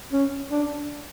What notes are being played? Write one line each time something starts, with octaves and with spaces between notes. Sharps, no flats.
C#4
D4